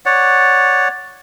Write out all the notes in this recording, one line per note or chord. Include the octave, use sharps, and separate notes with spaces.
C#5 D5 F#5